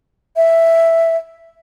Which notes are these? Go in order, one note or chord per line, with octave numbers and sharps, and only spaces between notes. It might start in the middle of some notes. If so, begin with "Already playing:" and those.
E5